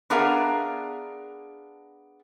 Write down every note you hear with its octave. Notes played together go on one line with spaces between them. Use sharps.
B3 D4 G#4 A#4 E5 F5